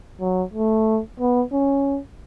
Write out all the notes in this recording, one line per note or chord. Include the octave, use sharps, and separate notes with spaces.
F#3
A3
B3
C#4